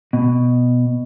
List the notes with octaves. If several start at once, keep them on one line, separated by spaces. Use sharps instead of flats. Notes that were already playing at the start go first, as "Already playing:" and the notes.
B2